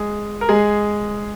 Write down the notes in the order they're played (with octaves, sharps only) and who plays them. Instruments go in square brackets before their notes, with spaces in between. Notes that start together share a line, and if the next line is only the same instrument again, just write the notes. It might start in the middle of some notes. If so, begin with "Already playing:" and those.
Already playing: [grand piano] G#3 G#4
A#4
G#3 G#4